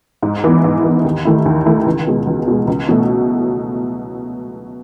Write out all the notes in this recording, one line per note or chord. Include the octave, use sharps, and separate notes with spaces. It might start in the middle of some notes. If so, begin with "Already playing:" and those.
G#2
E3 B3
G#2
E3 B3
D#2
D#3 A3 E4
D#2
D#3 A3 E4
C#2
B2 G#3
C#2
B2 G#3
C#2
B2 F#3 A3